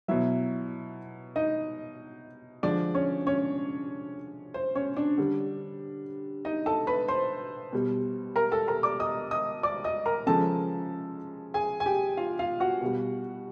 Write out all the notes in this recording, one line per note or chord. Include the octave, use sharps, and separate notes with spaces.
B2 F#3 E4 E5
D#4 D#5
D3 F3 G#3 D4 D5
C#4 C#5
C#4 C#5
C5
C#4 C#5
D4 D5
D3 G3
D#4 D#5
A4 A5
B4 B5
C5 C6
B2 G3
A#4 A#5
A4 A5
A#4 A#5
D5 D6
D#5 D#6
D#5 D#6
D5 D6
D#5 D#6
A#4 A#5
C#3 F3 G#3 A4 A5
G#4 G#5
G#5
G4 G5
F4 F5
F4 F5
F#4 F#5
B2 G3